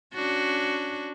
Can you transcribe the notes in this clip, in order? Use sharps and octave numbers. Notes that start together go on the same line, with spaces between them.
C#4 D4 F#4